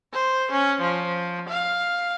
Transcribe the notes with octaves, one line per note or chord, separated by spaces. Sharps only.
C5
C#4
F3
F5